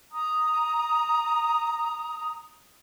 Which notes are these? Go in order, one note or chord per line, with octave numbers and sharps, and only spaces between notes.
A#5 D#6